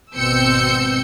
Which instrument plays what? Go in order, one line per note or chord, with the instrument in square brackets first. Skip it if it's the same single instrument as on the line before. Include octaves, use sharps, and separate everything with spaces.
[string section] G#1 B2 C4 E6 G6 C#7